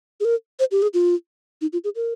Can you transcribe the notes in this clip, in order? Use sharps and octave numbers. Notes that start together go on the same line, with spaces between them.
G#4
A#4
C5
G4
G#4
F4
D#4
F4
G#4
A#4